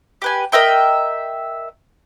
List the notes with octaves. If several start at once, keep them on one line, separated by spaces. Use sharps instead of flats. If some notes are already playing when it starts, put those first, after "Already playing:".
G4 B4 G#5
A#4 D#5 E5 G5